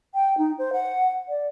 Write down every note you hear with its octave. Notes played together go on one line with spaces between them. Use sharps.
G5
D#4
C5
F#5
D5